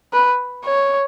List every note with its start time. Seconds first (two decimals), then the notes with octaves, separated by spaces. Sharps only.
0.13 B4
0.65 C#5